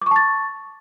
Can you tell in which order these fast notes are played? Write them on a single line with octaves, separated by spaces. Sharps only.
D6 C#6 A5 A6